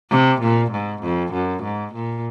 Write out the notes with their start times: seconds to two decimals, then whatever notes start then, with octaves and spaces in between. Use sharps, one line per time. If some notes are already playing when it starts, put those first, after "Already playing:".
0.10 C3
0.41 A#2
0.72 G#2
1.02 F2
1.33 F#2
1.63 G#2
1.94 A#2